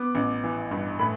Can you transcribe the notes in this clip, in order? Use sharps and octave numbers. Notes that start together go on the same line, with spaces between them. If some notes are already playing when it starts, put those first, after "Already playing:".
Already playing: B3 D6
A1
E3
G2
A2 B5